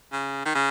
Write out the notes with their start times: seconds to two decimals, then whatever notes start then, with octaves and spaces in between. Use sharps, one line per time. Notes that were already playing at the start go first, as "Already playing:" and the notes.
0.13 C#3
0.46 D#3
0.55 C#3